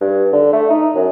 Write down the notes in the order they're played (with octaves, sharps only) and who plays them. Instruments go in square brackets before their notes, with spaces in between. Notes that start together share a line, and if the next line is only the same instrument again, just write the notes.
[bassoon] G2
D3
A3
D#4
F#2